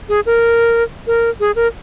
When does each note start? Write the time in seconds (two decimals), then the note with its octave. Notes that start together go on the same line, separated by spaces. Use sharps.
0.09 G#4
0.26 A#4
1.07 A#4
1.40 G#4
1.56 A#4